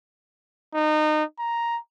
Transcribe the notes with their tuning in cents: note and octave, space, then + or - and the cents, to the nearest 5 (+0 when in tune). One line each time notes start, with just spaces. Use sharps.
D#4 -25
A#5 +5